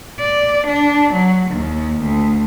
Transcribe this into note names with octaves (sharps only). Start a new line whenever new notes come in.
D5
D4
F#3
D#2
D2